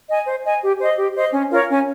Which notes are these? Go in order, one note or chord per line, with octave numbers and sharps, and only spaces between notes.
D#5 G#5
C5
D#5 G#5
G4
C5 D#5
G4
C5 D#5
C#4
F4 A#4 C#5
C#4